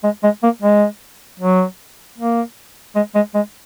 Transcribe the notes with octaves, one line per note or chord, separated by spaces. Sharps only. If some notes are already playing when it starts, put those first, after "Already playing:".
G#3
G#3
A#3
G#3
F#3
A#3
G#3
G#3
G#3